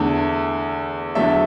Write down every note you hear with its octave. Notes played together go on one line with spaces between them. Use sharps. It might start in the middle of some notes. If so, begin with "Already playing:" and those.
Already playing: E2 D3 A3 E4
E2 D3 F#3 A3 E5